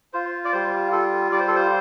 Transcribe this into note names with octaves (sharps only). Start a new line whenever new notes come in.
F4 C5
D5
G3 C5
F4 A4
G3 D5
C5
A4
C5